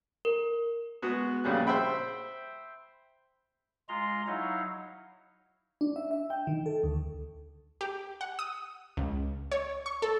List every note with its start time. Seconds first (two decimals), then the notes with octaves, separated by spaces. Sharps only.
0.25 A#4
1.02 G#3 B3 F#4 G#4
1.44 A#1 C#3 G3 F#6
1.67 C5 E5 G5 B5
3.89 G#3 F4 A#5 C6
4.27 F#3 D#4 E4 C#5 D#5 F5
5.81 D4
5.96 E5
6.11 E5
6.30 G5
6.47 D#3
6.66 A4
6.84 D2
7.81 G4
8.21 F#5
8.39 D#6
8.97 C#2
9.52 C#5
9.86 C#6
10.02 A4